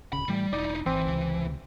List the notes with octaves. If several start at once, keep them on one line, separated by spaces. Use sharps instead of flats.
D1 G#1 C#3 B5
A2 E3 G3 A3
E1 D#4 E4 D5
G#1 E3 C4
C#2 C3